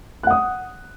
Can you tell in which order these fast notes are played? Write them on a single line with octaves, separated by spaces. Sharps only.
F#6 F#5 D#6